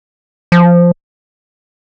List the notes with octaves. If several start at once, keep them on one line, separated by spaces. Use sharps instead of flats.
F3